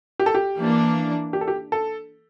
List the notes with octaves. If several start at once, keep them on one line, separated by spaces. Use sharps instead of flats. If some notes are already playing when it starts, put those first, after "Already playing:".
G4
A4
G4
E3 A#3 D4
G4
A4
G4
A4